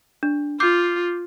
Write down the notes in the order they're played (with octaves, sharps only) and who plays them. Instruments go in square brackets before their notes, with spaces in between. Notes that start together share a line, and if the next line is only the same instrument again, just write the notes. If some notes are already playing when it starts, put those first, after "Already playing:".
[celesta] D4
[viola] F4 [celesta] D6 G6 C7